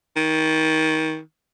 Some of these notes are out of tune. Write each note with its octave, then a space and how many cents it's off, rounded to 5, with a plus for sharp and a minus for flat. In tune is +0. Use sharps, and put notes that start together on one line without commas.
D#3 +25